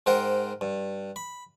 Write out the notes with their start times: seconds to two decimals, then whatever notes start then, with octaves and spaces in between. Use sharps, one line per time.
0.06 G#2 A#4 C5 F#5 G5
0.61 G2
1.16 B5